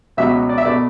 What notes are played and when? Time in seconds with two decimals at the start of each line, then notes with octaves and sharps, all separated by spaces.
0.17 C#2 B2 F#3 E5
0.49 D5
0.58 E5
0.65 B2 A3 D5